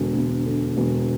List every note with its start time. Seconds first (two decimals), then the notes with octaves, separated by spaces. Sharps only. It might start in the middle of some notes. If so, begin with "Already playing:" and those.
Already playing: E1 D3
0.14 E1
0.45 D3
0.77 E1